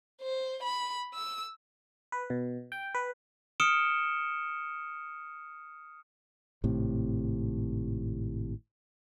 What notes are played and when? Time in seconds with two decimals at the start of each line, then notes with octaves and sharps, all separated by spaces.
0.21 C5
0.63 B5
1.14 E6
2.12 B4
2.30 B2
2.72 G5
2.95 B4
3.60 D#6 F6 C#7 D7 E7 G7
6.64 G#1 A2 C3